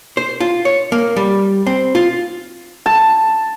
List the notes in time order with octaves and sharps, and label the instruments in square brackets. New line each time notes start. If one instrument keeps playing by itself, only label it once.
[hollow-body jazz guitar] C5
F4
C#5
A#3
G3
C4
F4
[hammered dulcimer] A5